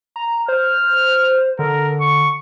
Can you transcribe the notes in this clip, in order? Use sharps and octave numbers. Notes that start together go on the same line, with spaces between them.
A#5
C5 F6
D3 A#4
C#6